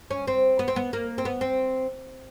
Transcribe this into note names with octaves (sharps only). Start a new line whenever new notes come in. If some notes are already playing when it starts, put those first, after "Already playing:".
C#4
C4
B3
C4
B3
A#3
C4
B3
C4